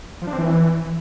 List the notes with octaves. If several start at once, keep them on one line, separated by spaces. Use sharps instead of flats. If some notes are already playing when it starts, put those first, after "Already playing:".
F3
D4
C4
E3